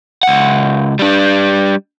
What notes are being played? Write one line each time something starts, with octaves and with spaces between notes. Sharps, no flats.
C#2 F#5
G3 D4